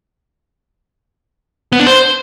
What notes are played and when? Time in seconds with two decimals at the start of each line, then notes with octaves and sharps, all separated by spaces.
1.73 B3
1.80 D4
1.87 C5